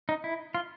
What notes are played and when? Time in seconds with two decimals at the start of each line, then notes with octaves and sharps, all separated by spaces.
0.09 D#4
0.24 E4
0.55 F4